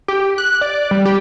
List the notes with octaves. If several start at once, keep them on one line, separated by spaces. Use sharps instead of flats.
G4
F#6
D5
G3
G4